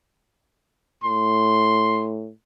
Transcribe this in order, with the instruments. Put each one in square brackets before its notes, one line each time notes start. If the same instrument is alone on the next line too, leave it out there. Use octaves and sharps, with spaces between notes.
[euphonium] A2 [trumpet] C6